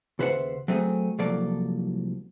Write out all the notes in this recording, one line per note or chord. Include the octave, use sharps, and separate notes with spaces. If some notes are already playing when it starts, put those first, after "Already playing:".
D#2 C#3 B4 C5 E5 F#5
F#3 A3 C4 G#4
C2 F3 F#3 A#3 A4 D5